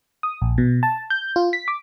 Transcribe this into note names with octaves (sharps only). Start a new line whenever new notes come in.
D#6
A#1
B2
A5
G6
F4
B6
D6